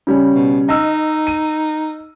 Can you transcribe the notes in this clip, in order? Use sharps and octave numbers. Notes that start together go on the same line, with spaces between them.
C#3 G3 C#4
B2
D#4 D#5 E6 F6
D#7